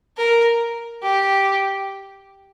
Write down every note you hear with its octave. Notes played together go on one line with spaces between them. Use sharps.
A#4
G4